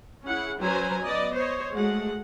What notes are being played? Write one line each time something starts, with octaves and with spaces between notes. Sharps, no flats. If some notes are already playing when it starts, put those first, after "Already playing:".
C#4 E4 G#4 F#5
F#3 C#4 B4 C5 G#5 A#5
B3 D5 D#5
C5 C#5 D#5
G#3 A3 F#4 F#5